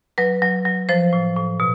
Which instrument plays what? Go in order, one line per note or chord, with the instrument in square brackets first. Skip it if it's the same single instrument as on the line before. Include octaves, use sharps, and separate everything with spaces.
[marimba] F#3 B4
F#3
F#3
F3 C5
A2
A2
B2